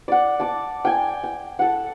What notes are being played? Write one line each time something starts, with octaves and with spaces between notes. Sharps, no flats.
D5 F#5
A5 D6
G5 G#5
G5
A4 F#5